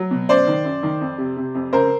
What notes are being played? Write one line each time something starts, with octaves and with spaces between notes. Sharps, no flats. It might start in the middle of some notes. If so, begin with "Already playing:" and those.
Already playing: F#3
B2
F#2 C5 D5
D#3
F#2
D#3
F2
C3
C3
F2
C#2 A#4 C5